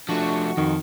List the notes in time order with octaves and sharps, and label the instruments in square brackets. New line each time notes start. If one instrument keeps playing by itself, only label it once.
[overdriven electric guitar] F3 A3 [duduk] D4 [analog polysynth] F#4 C#6
[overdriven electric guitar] F2 [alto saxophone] D#3